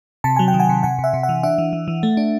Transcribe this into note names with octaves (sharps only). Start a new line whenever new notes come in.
C3 A5
F#3 G#5
G5
D#3
F#5 G#5
C3
C3 F#5 G#5
C3
E5 F#5
C3
E5 F#5
E3
D4 E5 F#5
E3
E3
E3
A3
D4